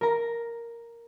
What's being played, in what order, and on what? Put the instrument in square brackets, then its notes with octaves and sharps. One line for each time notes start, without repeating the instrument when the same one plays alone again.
[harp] A#4 A#5